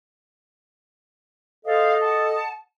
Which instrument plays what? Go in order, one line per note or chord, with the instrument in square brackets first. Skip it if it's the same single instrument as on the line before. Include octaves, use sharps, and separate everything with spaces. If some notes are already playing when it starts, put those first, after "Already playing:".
[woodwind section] A4 D#5 [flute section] C5 F5
[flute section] F#5 A5